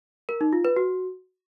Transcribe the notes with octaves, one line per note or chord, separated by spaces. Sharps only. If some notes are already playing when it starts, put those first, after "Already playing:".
A#4
D#4
F4
B4
F#4